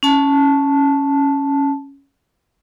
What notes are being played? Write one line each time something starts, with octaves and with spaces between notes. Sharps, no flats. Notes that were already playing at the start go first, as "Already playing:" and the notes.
C#4 A5